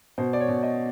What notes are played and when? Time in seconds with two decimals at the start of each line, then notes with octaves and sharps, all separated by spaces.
0.18 B2 C5
0.33 D5
0.40 C#5
0.48 B2
0.63 D#5